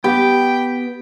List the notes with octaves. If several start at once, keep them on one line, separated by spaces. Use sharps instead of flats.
B3 G4 G5